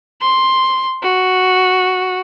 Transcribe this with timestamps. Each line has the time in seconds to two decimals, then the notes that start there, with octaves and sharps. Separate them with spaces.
0.21 C6
1.03 F#4